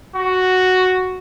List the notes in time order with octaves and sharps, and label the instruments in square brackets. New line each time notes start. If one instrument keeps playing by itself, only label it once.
[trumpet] F#4